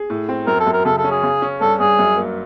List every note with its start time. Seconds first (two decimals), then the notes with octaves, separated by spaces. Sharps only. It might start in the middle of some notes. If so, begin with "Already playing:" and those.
Already playing: G#4
0.10 A2
0.29 C4
0.47 F#2 A#4
0.60 A4
0.67 F#2
0.73 A#4
0.85 C#3 A4
0.98 A4
1.04 C#4
1.11 G#4
1.23 C#3
1.42 C#4
1.61 G2 A4
1.80 G2 G#4
1.99 F#2
2.17 A#3